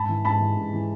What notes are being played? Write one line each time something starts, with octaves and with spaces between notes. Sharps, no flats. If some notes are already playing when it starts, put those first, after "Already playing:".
Already playing: G#2 A5 B5
E3
G#2 A5 B5
E3
G#2
E3